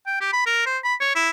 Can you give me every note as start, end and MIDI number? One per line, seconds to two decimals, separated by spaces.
0.07 0.20 79
0.21 0.28 67
0.33 0.46 83
0.46 0.65 70
0.66 0.78 72
0.84 0.95 83
1.01 1.13 73
1.15 1.30 64